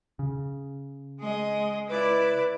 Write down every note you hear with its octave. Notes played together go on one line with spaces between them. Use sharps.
C#3
G#3 G#4 D#5
E4 B4 D5 D6